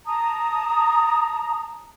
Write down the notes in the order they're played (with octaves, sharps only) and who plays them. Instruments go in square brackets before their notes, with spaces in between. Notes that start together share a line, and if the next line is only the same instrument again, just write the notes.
[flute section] A5 A#5 D#6